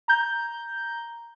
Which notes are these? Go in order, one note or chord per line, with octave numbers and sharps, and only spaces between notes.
A#5 G6